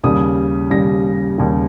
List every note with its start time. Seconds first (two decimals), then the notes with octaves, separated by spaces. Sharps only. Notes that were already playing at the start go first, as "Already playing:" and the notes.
0.03 D#2 C#3 G3 D#6
0.70 D#2 C#3 G3 A#6
1.38 D#2 C#3 G3